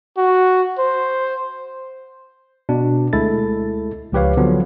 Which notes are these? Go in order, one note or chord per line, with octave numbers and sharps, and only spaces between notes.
F#4
C5
B2 D4
D2 G#3 E4 A4 A6
C#2 F3 G4 B4 C#5 F5
D3 F3 F#3 B3